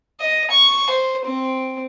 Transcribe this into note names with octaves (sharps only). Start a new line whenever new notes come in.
D#5
C#6
C5
C4